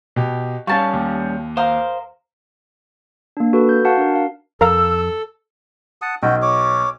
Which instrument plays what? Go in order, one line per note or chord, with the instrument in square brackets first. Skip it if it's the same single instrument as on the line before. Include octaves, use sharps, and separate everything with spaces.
[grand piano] B2 G4
[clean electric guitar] G3 C#4 [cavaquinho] F5 A5 [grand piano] C#6
[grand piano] D#2
[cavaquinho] A#4 F5 D#6 [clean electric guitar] C5
[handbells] A#3 D4
F#4 A4 B4
G6
F#4 F5 F#5 A5
D4 A#4
F5
[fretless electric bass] F2 [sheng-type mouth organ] A4 [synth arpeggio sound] A#4 F5 A#5 [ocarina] E6
[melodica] F#5 A5 D#6
[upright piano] B1 [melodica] F#4 G5
[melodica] C#5 D6